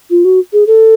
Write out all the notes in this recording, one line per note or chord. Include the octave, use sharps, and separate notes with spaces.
F4
F#4
G#4
A4